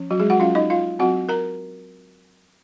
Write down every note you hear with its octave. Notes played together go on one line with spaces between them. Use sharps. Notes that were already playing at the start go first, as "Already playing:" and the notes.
Already playing: F3 C#4
F#3 F#4
G#3 G#4
F#4 F#5
F#3 C#4 F4 F5
D#4 D#5
F4 F5
F#3 C4 F#4 F#5
A#4 A#5